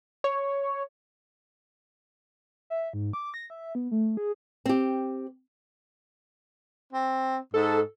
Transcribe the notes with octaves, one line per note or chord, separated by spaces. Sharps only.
C#5
E5
G#2
D6
A#6
E5
B3
A3
G#4
C4 G4
C4
G#2 A4